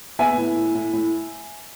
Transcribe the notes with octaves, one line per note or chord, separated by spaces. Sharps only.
B3 E5 G#5
A2
A2
A2
A2